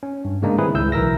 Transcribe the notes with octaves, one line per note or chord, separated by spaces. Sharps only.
C#4
G2
G#2 C#3 G#3 A#3 D4 D#4
D#3 G3 C4 E4 G#4 B4
C#2 E4 E6 G6
B1 E3 A#4 E5 E6 A#6